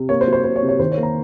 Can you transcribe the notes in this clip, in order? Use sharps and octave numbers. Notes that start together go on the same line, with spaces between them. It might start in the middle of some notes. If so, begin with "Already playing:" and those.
Already playing: C3
A#3 C#5
C5
F#3
C5
C3 C5
C#5
C3
C#5
D#3 C5
C#5
A#3
A#5